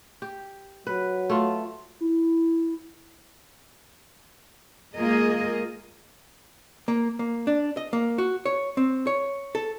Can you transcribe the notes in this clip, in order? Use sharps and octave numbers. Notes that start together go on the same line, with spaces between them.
G4
F#3 B4
A3 F4
E4
G#3 A#3 F4 G#4 A#4 D#5
A#3
A#3
D4
D#5
A#3
F#4
C#5
C4
C#5
A4